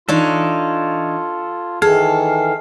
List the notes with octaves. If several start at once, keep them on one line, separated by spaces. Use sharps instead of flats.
E3 D4 D#4 F4 A4 C#5
D#3 E3 G#4 A4 F5